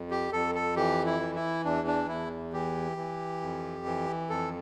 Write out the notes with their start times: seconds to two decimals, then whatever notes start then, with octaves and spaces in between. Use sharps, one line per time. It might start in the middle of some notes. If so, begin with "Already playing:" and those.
Already playing: F2
0.11 G4
0.32 F2 A4
0.55 A4
0.76 E3 G4
1.06 E4
1.20 E3
1.35 E4
1.65 E2 D4
1.87 D4
2.09 E2 E4
2.53 E3 G4
2.97 E3
3.41 F2
3.86 E3
4.30 F2 A4